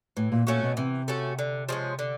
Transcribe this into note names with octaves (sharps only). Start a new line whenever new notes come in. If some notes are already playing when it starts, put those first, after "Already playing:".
A2 E3
A#2
A#2 A3 C#4 F#4
B2
C3 E3
A3 C#4 F#4
D3
F3 G#3 C#4
D3